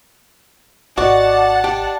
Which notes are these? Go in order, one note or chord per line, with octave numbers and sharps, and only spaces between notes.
G#1 F#4 D5 D#5 F#5 A5
D4 G4